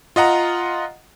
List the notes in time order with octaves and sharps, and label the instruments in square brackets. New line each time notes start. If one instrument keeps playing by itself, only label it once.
[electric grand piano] F4 D#5 F#5 A#5